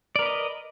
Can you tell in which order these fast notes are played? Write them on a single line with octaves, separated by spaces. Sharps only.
D5 A#4 B4 D#5